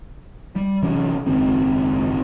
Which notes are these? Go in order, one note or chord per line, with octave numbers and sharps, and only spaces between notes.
G3
C3 E3 F#3 C#4
F#1 G#2 D#3 C4